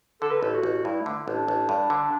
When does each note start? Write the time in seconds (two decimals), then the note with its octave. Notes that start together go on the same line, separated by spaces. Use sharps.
0.22 D3 A4
0.31 B4
0.41 A1 A4
0.54 F#4
0.63 A1
0.85 G2 E4
1.01 A3
1.06 D3
1.28 A1 D4
1.48 A1
1.69 G2
1.90 D3